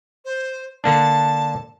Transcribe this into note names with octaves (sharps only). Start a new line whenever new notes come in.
C5
D3 A#3 D4 A5